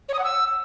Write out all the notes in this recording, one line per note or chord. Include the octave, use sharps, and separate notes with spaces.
C#5
D#6
F#5
E6